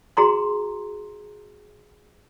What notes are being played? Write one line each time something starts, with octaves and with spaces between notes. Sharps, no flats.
F#4 G#4 A#5 C6